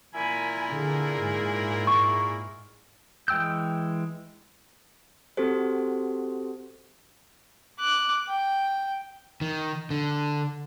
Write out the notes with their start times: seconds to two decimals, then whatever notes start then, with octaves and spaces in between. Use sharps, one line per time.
0.14 A#2 E4 A#4 G#5 B5
0.72 D3 G#4
1.20 G#2
1.87 C#6
3.28 E3 G#3 G5 E6 G6
5.37 C4 F#4 G4 A4 C5
7.79 D6 F#6
8.27 G5
9.41 D#3
9.90 D3